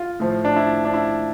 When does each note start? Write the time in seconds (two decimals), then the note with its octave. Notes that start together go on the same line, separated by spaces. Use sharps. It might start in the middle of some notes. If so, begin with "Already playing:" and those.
Already playing: F4
0.20 A2 F3
0.45 D4
0.56 E4
0.85 D4
0.94 E4